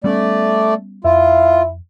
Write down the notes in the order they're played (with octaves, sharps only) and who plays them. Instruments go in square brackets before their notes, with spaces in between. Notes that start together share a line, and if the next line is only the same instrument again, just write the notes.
[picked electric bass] G3 B3 C#4 [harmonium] A3 D5
[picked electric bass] F2 [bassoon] E4 [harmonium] F4